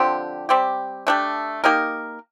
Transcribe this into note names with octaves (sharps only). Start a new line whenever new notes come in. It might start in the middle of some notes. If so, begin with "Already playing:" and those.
Already playing: D3 F3 C4 G4
G3 C4 G4
A3 D4 G4
A#3 D#4 G4 A#4